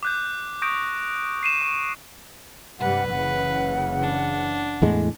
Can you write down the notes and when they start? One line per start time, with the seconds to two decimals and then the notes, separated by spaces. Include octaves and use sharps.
0.03 D6 F#6 G6
0.62 C#6 D#6 G6 A#6 D7
1.43 C7 D#7 E7
1.62 C#6
2.80 G2 C3 G3 B4 F#5
3.10 F#1 C#3 E3 F#5
4.02 D4
4.82 E2 A2 G#3